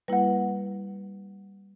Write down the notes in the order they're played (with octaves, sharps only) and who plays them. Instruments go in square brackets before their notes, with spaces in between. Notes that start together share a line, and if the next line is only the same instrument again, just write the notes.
[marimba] G3 A#3 E4 [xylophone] B4 F#5